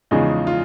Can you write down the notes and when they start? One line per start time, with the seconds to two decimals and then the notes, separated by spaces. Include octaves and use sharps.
0.11 E2 C#3 F3 G#3 D#4
0.47 F4